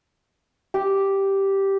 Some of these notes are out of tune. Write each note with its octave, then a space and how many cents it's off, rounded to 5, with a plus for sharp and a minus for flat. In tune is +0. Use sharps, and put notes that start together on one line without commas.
G4 -5